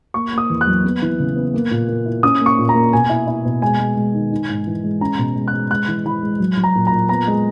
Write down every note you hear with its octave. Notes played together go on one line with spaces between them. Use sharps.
A#3 C#6
A#3 D#6
E2
F#6
F#3
B3
E3
C#3
B3
A#3
A#2
A#3
E4
C#4 D#6
A#3
C#6
A#2
A#5
A#3
B2 G#5
E4
E4
B2
G#3 G#5
G#3
G#3
D#3
D#4
G#2
E3
G#3
C#4 A#5
B2
G#3
F#6
G#3
G#3 F#6
E3
E3 B5
G#3
F#3
F#3
A#5
A#2
A#5
A#2
B3 A#5
G#3